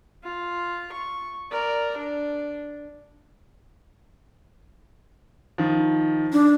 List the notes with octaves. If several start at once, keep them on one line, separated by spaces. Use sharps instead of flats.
F4
C#6
A#4 D5
D4
D#3 F3
D4